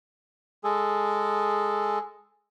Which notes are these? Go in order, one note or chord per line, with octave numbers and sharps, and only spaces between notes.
G#3 G#4 A4